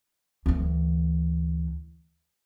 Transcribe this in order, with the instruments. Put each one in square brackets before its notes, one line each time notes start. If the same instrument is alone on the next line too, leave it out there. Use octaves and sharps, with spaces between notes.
[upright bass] D2 E3